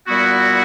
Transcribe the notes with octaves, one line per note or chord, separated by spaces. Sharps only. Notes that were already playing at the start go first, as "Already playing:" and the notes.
A#2 G3 B3 E4 F#4